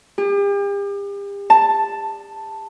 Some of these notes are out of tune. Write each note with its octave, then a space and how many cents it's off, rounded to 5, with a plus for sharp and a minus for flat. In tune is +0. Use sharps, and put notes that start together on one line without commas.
G4 +40
A5 +5